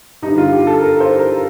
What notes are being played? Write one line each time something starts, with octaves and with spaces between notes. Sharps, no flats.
G2 D#4
D3
F4
G4
A4
A#4
C5
A#4